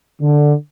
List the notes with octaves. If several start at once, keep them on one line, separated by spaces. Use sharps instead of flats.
D3